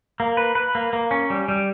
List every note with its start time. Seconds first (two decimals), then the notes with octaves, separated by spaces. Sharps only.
0.20 A#3
0.37 B4
0.55 B4
0.75 A#3
0.93 A#3
1.11 C#4
1.30 G3
1.48 G3